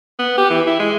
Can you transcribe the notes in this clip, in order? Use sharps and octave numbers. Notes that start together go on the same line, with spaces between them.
B3
G4
E3
E4
G#3